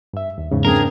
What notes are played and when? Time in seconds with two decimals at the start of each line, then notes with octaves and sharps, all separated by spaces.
0.14 G2 E5
0.38 D#2
0.52 E2 G#2 C#3
0.65 C4 D4 G#4 A#4